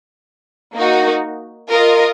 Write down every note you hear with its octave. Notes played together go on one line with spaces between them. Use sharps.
A#3 D#4 F#4
F4 A#4 D#5